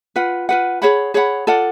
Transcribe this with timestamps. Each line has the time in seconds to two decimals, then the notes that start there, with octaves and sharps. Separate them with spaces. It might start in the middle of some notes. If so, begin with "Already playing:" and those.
0.16 F4 B4 F#5
0.49 F4 B4 F#5
0.82 G#4 C#5 F#5 B5
1.14 G#4 C#5 F#5 B5
1.47 F4 A4 D5 F#5